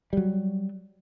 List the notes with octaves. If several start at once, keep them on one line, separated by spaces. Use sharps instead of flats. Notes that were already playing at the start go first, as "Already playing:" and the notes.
F#3 G3